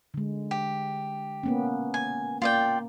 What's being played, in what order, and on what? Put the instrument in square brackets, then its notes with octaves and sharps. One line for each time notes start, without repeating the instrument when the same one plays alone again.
[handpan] D3 G#3
[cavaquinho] G4
[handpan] A#3 B3 C#4
[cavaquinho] G#5
[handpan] A#3 [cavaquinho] F4 D5 G5